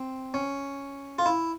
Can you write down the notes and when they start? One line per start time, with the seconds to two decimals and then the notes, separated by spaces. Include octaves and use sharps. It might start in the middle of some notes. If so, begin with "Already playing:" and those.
Already playing: C4
0.34 C#4
1.19 F4
1.26 E4